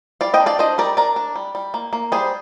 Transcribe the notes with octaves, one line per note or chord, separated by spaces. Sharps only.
G3 D5 F5
D#5 G5
D4
D5 F5
D4 C5 D#5
G3 A#4 D5
D4 A#4 D5
D4
G3
G3
A#3
A#3
G3 G#4 C5